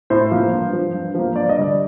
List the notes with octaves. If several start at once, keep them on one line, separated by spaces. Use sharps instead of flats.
A2 C5
F3 A#3
G2
F3 C4
G2
F3 A#3
G2 D5
D#5
D3 G3 D5